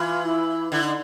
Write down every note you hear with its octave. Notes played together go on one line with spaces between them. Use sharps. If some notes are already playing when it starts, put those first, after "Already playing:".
Already playing: E3 F4
E4
D3 E4
D#4